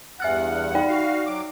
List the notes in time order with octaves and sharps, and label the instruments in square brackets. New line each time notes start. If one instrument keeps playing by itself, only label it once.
[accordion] E2 G2 F#5 [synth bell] E5 F6 F#6
[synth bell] D#4 D5 G5
[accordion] F#4 F5
F#3 D6